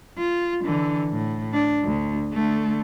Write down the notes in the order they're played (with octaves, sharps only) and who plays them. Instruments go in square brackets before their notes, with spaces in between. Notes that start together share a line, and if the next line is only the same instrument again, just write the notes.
[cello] F4
D3 E3
A2
D4
D2
D3 A3